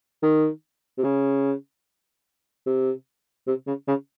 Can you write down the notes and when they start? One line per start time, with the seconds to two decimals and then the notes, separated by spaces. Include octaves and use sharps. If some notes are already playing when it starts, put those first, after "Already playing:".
0.23 D#3
0.98 C3
1.04 C#3
2.66 C3
3.47 C3
3.67 C#3
3.88 C#3